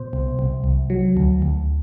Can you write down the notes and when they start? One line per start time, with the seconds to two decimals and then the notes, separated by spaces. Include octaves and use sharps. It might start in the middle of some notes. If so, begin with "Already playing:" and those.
Already playing: B2 C5
0.13 C2
0.39 C2
0.64 C2
0.90 F#3
1.17 D2
1.42 D2